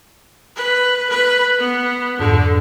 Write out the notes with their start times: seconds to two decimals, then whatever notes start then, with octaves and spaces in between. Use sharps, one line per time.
0.56 B4
1.09 B4
1.59 B3
2.19 F2 G#2 D3